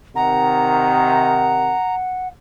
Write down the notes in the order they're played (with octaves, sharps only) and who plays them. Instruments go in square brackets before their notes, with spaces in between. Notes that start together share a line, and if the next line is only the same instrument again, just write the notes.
[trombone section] C3 D#3 [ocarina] F#5 [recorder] A#5